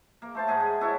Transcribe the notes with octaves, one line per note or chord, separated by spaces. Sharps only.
A#3
A3 C5 A5
G#2 G#4 D#5 F#5
G#4
E4 F#4 A4 C#5